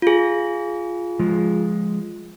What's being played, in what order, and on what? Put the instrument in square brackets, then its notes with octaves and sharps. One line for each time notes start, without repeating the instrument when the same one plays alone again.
[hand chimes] F4 G#4
[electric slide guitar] F3 G#3